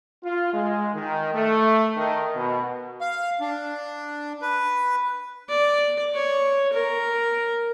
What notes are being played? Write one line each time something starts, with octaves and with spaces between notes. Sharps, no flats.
F4
G#3
D#3
A3
D#3
B2
F5
D4
B4
D5
C#5
A#4